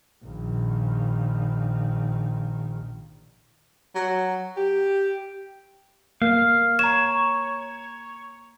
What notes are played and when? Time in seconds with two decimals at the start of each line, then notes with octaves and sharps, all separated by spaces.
0.25 A#1 D#3
3.95 F#3
4.56 G4
6.22 A#3 F5
6.79 C#5 A#5 E7